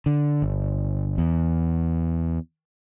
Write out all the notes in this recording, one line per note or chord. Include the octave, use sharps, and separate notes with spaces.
D3
G1
E2